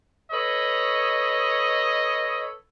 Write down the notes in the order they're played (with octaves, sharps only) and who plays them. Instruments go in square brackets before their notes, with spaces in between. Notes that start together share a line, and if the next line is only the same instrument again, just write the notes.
[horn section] A4 B4 C#5 [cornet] D#5